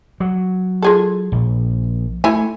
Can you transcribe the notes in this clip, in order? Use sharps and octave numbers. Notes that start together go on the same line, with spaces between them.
F#3
F4 G#4 A4
A#1
A3 E4 G#5